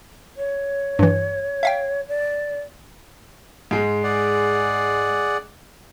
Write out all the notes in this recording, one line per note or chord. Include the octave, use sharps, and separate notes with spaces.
C#5
G2 E3
E5 F5 G5
D5
G#2 G#3
G#4 D5 F#5